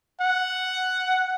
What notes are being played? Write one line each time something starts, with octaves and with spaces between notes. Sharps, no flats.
F#5